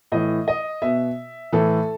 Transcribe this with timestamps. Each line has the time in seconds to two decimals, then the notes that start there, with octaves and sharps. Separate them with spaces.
0.12 A2 E3 D#5
0.48 D#5
0.82 B2 E5
1.53 A2 E3 A4